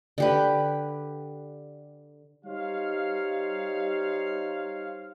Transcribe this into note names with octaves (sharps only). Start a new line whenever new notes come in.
D3 G4 B4
G3 D#4 G4 C5 C#5 F5